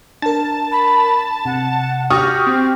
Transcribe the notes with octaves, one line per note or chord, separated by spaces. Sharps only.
D4 A#4 A5
B5
C3 F#5
F#4 G4 G5 C#6 D#6 F6 A6 A#6
C4